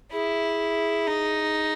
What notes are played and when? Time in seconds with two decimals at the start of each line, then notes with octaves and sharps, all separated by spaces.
0.12 E4 G#4
1.07 D#4